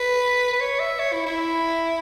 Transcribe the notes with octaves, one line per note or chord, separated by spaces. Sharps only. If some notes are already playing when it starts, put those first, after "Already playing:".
Already playing: B4
B4
C#5
E5
C#5
E4
E4